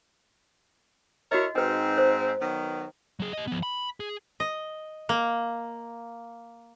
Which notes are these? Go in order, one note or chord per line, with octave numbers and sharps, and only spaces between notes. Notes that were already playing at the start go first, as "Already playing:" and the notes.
E4 F#4 A#4 C#5 D#5
G#2 C4 D#4 B4 G5
C5
D#3 F#3 B3
F#3 G#4
G4 D#5
F3 B3
B5
G#4
D#5
A#3